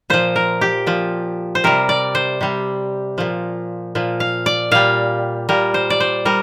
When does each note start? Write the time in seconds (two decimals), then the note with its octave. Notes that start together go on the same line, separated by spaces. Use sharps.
0.10 A#2 F3 C5
0.36 A#4
0.61 G4
0.86 A#2 F3
1.55 C5
1.64 C3 G3 A#4
1.89 D5
2.15 C5
2.41 C3 G3
3.18 A#2 F3
3.95 A#2 F3
4.20 F5
4.46 D5
4.71 A#2 G3 F5
5.49 A#2 G3 A#4
5.74 C5
5.90 D5
6.00 C5
6.25 G3 A#4